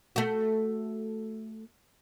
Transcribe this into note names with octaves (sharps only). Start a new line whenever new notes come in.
A3 F#4